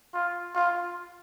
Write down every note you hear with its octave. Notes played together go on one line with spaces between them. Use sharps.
F4
F4